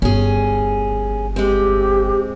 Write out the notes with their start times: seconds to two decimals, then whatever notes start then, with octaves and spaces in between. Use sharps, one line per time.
0.02 G1 C#4 G#4
1.36 G#3 C4 G4